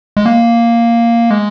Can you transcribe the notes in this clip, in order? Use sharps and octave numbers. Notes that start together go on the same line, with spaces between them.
G#3
A#3
G#3